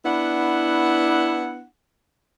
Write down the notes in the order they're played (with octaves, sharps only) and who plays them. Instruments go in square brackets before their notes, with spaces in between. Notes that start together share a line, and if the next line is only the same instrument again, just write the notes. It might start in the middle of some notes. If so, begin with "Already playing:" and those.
[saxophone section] B3 D4 E4 F#5